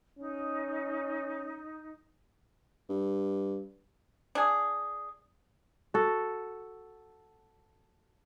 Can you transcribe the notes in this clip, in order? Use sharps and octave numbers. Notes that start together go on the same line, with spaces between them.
C#4 D#4
G2
D4 G#4
F#4 A4